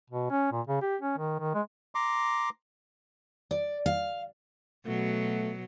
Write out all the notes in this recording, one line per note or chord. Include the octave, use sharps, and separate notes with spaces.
B2
C#4
A#2
C#3
G4
C#4
D#3
D#3
G#3
A#5 C6 D6
D5
F5
B2 F#3 A3